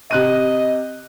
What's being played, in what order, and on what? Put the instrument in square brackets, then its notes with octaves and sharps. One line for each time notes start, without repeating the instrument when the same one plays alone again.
[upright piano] C3 F#6 D#7 [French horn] D#5